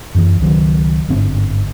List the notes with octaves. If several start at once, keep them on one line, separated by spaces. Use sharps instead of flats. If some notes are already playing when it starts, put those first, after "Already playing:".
F#2 E3
C#2 D#3 F#3
G1 G#2 D3 C4